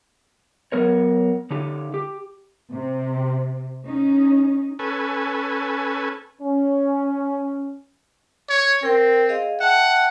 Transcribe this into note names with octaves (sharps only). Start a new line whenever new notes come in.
F#3 B3 A#4 C#5
D3 D#4 G4
G4
C3
C#4 D#4
C#4 A4 B4 G#5
C#4
C#5
C4 A#4 G5
G#4 D#5 F5
E5 F#5 G5 A5